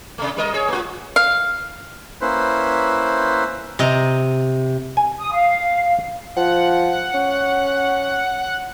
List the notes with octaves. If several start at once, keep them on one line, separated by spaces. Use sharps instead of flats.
C3 A3
G3 A#4 D#5
G#4 C#5
A3 F4
F5
A#3 C#4 E4 B4 C5
C3 D#5 A#5
G#5
D#6
F5
F3 F#5
C#4